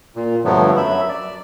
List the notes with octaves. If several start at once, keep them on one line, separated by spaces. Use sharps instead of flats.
A#2
G2 D3 F3 F#3 A3 B3
F#2 F#3 E5 B5
D5